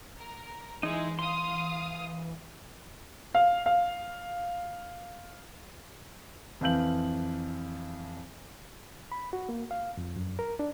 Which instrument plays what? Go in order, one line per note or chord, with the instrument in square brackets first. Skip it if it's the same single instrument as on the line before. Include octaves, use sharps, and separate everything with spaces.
[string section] A#4
[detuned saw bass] E3 [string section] G#3 [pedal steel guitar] D#4 E4
[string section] F5 D#6 [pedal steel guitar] C6
[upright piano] F5
F5
[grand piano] F2 E3 F5 G6 F#7
[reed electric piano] B5
F#4
A#3
F5
F2
F#2
A#4
D4